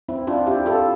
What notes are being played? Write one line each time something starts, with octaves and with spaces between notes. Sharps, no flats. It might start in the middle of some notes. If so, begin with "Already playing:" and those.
C4 E4
D4 F4
E4 G4
F4 A4